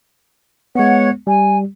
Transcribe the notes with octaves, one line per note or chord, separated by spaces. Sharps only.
G#3 B3 C#5 F#5
G3 G#5